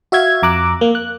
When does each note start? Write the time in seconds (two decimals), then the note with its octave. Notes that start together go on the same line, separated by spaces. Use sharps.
0.12 F#4 E5 F5 G#6
0.43 F2 A#5 D6 E6 F#6
0.81 A#3
0.95 F#6